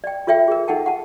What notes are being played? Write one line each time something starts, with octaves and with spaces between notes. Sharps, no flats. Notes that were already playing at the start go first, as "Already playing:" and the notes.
D5 G5
F4 A4 C#5 E5 G5
G#4 A#4
D#4 A4 F#5 G5 A5
F#5 A5